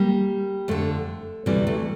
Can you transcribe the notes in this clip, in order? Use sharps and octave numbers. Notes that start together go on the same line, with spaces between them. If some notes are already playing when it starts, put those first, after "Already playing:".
Already playing: G3 A#3
F2 D3 A3
D2 C3 E3 G3
A3